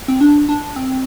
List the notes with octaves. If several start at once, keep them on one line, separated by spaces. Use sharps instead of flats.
C4
D4
D4
C4